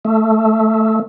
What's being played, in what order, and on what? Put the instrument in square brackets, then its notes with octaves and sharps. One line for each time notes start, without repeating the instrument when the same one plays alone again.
[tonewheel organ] A3